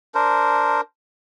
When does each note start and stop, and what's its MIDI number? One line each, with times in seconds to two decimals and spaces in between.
0.15 0.81 62
0.15 0.81 70
0.15 0.81 72